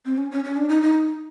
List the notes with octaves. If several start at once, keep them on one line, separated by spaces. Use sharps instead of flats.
C4
C#4
C#4
C#4
D4
D#4
D#4